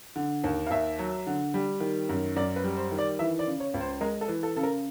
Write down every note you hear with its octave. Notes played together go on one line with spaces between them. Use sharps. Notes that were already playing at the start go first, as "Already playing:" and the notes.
D3
D#2
F5
D#2 E5
F#3
D3
G3
D#3
F#2
F#2 D5
B4
G3
C5
D#3
D5
E3 E5
D5
C#3
C#5
C#2
C5
G#3 A#4
A4
E3
A4
C#3 A4
A#4